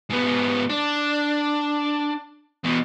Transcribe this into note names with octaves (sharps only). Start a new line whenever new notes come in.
G#2 B3
D4
E2 B2